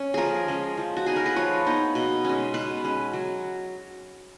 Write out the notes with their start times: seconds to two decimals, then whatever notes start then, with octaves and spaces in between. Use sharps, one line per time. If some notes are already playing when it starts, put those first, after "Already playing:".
Already playing: C#4 C#5
0.14 F3 G#4 A#4
0.48 G#3 C#4
0.78 F3
0.97 F#4
1.06 B3 D#4 G#4
1.16 A#4
1.26 B4
1.36 F3 C#5
1.66 B3 D#4
1.95 B2
2.25 G#3 C#4
2.54 B2 B4
2.84 G#3 C#4
3.13 F#3